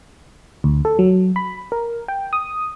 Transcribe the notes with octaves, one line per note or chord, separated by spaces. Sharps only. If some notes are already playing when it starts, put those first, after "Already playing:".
D2
A4
F#3
B5
A#4
G5
D#6